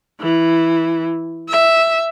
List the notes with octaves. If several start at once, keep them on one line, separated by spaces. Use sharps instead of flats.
E3
E5